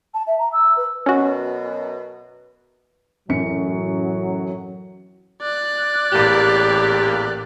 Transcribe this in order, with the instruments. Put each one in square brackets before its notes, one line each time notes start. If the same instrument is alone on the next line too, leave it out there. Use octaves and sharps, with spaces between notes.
[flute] A5
E5
A#5
E6
B4
[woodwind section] F#2 B2 [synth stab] C#4 F#4
[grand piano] A1 F#2 C#7 [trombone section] A2 F#3
[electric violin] D5 F#6
[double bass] A1 [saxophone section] E2 A#3 G4